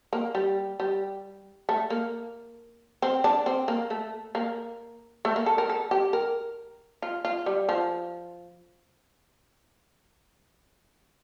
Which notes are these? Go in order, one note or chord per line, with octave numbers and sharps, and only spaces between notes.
A#3
G3
G3
A3
A#3
C4
D4
C4
A#3
A3
A#3
A3
A#3
A4
A#4
A4
G4
A#4
F4
F4
G3
F3